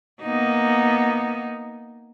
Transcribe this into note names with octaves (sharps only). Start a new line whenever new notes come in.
A#3 B3 D#4